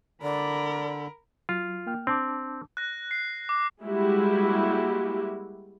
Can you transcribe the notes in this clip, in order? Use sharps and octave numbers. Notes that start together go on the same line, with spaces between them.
D3 A#4 D5 B5
F#3 F4
A#3 G5 F6
C4 D4 A5 D6
F#6 A#6
C7
D6
G3 G#3 A#3 E4 F#4 G4